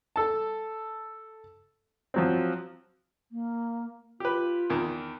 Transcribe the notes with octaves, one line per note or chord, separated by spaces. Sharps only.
A4 A5
F3 F#3 C4
A#3
F4 G4 B4
E2 D#3